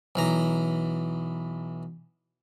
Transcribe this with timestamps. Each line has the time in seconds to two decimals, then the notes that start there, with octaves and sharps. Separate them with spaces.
0.16 B1 E3 A#5